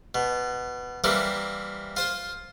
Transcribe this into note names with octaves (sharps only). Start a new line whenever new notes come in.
B2
E3 G3 A#3 C4
F4 C5